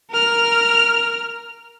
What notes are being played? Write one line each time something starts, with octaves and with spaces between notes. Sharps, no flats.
A#4 F6